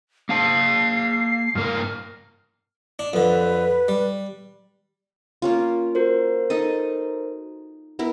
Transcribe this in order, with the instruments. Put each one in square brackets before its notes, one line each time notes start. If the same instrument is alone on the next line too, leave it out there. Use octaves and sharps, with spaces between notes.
[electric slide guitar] A#3 F5 A5 [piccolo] C7
[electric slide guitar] G2 A#3 A#4 [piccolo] F6
[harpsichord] D4
[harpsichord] F2 D3 [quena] B4
[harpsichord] G3
[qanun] A#3 C#4 F4
[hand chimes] F#4 A#4 C5
[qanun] D#4 A4 D#5
B3 E4 A#4